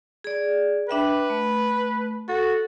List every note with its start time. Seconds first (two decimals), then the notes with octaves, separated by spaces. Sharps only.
0.24 G#4 D5
0.89 D4 B4 E5 G5
1.30 A3
2.28 F#4 A4